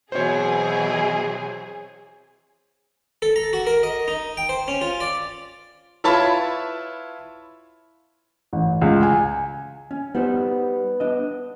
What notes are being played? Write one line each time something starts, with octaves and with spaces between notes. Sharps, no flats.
B2 E3 F#3 C4 G#4 C5 C#5
A4
A#5
F#4
A#4
D#5
D#4
G5
C5
C#4
F4
D5
E4 F4 B4 C#5 A5 B5
A1
C#2
G#5
C#4
G3 B3 D#4 C5
D4 D#5